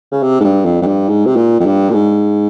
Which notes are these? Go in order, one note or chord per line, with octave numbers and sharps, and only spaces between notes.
C#3
C3
G#2
G2
F2
F2
G2
G#2
C3
A#2
F2
G2
A#2
G#2